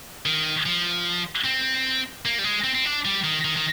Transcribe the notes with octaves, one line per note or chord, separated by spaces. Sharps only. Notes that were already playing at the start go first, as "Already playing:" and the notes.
D#3
F3
C4
A#3
G3
G#3
C4
C4
D4
G3
D#3
D#3
D#3